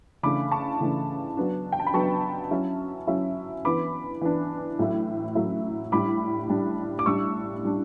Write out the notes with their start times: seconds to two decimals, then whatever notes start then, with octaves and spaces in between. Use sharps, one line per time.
0.23 C#3 E3 A3 D4 B5 D6
0.52 A5 C#6
0.80 C#3 E3 A3 D4
1.37 F#3 B3 D4
1.72 G5
1.80 A5
1.87 B5
1.94 F#3 B3 D4 A5 C#6
2.51 F#3 C#4 E4
3.07 F#3 C#4 E4
3.65 E3 B3 D4 B5 D6
4.21 E3 B3 D4
4.79 A2 F#3 A3 E4
5.35 A2 F#3 A3 E4
5.92 A2 G3 D4 B5 D6
6.49 A2 G3 D4
6.99 D6
7.06 A2 G3 D4 C#6 E6
7.63 A2 G3 D4